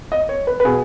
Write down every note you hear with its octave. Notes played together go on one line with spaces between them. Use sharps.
D#5
C#5
B4
B4
B2 G#4